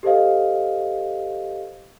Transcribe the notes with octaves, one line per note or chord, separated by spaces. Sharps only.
G4 A4 C5 D#5 F5